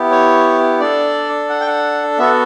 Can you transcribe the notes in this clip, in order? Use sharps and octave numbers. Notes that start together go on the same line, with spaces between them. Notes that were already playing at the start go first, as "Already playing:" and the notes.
Already playing: B3 E4 G4
C#5
D4 A4 D5
F#5
G5
F#5
B3 F#4 A4 E5